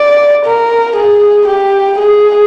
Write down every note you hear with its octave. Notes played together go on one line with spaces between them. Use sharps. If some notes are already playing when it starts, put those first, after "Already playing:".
Already playing: D5
A#4
G#4
G4
G#4